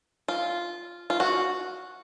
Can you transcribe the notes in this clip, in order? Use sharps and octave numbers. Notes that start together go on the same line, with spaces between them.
F4
F4
F#4